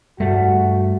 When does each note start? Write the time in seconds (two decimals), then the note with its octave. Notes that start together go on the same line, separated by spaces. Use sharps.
0.20 G2 G3 A3 F#4